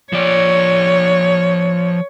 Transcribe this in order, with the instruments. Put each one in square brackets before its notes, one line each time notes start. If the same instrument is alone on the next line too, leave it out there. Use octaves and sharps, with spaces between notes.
[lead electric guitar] F3 D5 [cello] C#5